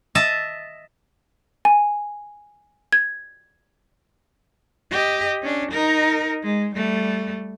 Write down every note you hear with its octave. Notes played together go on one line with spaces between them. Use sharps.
D#5 E5 A5
G#5
G#6
G4 D#5
C#4 D4
D#4 A#4
G#3
G3 A3